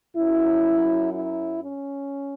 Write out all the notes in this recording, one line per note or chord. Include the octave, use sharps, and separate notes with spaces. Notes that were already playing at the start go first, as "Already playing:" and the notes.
F#2 F#3 E4
E4
C#4